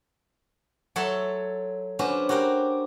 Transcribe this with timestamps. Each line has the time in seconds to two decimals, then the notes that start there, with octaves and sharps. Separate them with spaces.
0.96 F#3 A4 C#5 E5 F#5 C6
1.99 C#4 D4 F#4 B4 C5
2.29 F#4 G4 A#4 C5 G5